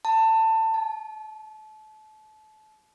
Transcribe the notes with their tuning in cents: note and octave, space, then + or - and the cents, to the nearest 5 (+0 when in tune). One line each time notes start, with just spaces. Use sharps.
A5 +20
A5 -30